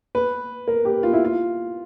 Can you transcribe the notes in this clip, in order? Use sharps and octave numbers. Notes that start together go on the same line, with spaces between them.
B4
A#4
G4
F4
E4
F4